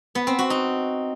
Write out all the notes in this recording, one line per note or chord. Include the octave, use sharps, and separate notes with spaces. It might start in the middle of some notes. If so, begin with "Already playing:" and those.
B3
C4
F#4
D#4